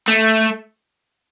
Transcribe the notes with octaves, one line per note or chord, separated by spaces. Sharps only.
A3